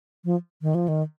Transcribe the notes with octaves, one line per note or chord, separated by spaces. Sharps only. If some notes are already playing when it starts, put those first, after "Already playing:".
F3
D#3
F3
D#3